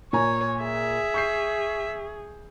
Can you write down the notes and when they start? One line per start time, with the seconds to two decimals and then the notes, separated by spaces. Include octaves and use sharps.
0.13 A#2 C#5 G#5 A#5
0.62 G#4 E5
1.14 C#6 G6 C7